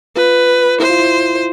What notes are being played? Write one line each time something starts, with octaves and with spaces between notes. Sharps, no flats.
F4 B4
E4 C5
F4
E4